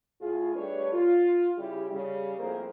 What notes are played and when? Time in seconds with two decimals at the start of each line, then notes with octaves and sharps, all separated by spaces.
0.21 A2 F4 G#4
0.55 G3 A3 D4 B4 C#5
0.93 F4
1.58 C#3 G3 E4 G4
1.91 C#3 G3
2.39 F2 A2 A#3 G#4 A#4 C5